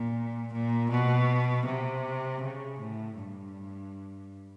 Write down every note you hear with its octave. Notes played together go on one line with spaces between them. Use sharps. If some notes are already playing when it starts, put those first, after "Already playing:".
Already playing: A#2
A#2
B2
C3
C#3
A2
G2